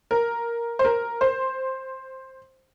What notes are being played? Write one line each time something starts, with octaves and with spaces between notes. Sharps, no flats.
A#4
C5
A#4
C5